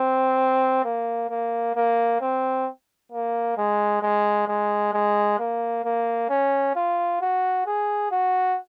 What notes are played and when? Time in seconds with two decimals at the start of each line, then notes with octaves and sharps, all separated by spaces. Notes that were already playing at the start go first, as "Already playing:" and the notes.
Already playing: C4
0.84 A#3
1.29 A#3
1.75 A#3
2.21 C4
3.12 A#3
3.57 G#3
4.02 G#3
4.47 G#3
4.93 G#3
5.39 A#3
5.84 A#3
6.29 C#4
6.75 F4
7.21 F#4
7.66 G#4
8.11 F#4